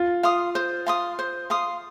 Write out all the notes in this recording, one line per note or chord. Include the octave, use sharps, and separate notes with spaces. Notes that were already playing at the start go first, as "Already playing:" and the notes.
Already playing: F4
F5 C6 D#6
C5
F5 C6 D#6
C5
F5 C6 D#6